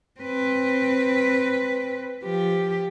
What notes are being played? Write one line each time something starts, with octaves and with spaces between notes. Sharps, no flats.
C4 B4
F3 G4